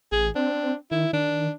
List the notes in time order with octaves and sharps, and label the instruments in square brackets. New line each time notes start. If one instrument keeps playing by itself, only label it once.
[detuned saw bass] A1 [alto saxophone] G#4
[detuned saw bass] C4 [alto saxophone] D4
[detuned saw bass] D#3 [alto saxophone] E4
[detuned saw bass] D#3 [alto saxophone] D4